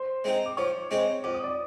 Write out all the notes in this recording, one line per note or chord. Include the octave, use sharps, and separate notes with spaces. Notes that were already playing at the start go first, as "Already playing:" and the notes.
Already playing: C5 C6
G#3 C4 D#4
D6
F3 C#5 C#6
G#3 C4 D#4
F2 D6
D#6
D5 D6